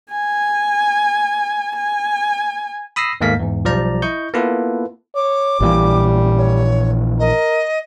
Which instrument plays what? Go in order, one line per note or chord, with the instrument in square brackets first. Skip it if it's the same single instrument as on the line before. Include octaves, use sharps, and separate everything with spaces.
[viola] G#5
G#5
[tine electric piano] B5 D#6 E6 A#6 C7
D#2 G#2 A3 A#3 F5 B6
E2 G#2
B1 F3 G3 D5 A#5
E4 D#5 C#6 G6
A#3 B3 E4 F4 A4 B4
[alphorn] C#5 [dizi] D6
[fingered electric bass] A#1 A#2 E3 [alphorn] G3
[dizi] C#5
[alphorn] A#4 [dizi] D#5